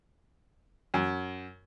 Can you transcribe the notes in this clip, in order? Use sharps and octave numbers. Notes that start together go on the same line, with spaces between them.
F#2